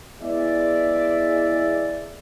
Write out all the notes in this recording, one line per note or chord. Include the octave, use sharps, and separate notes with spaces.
E2 G#3 D5 E5